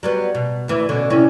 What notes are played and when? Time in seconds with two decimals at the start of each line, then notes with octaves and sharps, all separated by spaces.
0.03 F#3 G3 B3
0.35 B2
0.68 D2 E3 E5
0.89 B2 D3 C#4
1.10 C3 E3 C#4